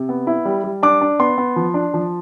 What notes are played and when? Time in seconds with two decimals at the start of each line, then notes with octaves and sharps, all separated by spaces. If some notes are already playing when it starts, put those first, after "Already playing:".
Already playing: C3
0.09 B3
0.27 E4
0.45 G3
0.64 G3
0.83 D4 D6
1.01 D4
1.19 B3 C6
1.38 B3
1.56 F3
1.74 D4
1.94 F3